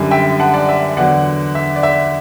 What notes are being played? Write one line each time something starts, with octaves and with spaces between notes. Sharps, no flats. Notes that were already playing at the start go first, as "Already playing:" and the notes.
Already playing: F#2 D3 G3
E5 G5
F#5 A5
D5 F#5
E5
E2 D3 F#3 D5 F#5
E5
D5
E5